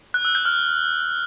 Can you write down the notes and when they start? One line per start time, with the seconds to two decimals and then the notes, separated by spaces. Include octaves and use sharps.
0.14 F#6
0.25 E6
0.35 G6
0.45 F6